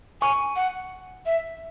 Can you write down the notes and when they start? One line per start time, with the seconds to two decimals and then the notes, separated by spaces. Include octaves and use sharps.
0.21 G#5 C#6
0.56 F#5
1.26 E5